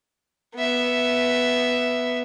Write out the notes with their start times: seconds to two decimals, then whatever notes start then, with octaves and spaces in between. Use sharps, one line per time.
0.55 B3 E5